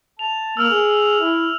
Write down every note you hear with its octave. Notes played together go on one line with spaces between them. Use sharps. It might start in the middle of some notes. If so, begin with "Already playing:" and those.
A5 F7
A#3 E6 F6 F7
G#4
E4